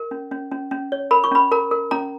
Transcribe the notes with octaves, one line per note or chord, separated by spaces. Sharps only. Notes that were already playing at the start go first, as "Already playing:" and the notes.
Already playing: A#4
C#4
C#4
C#4
C#4
C#5
A#4 B5
C#6
C#4 B5
A#4 A#5
A#4
C#4 A#5